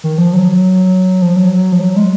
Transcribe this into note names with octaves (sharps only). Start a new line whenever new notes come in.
D#3
F3
F#3
F3
F#3
F3
F#3
G#3